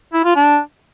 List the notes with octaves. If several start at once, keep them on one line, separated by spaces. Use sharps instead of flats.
E4
F4
D4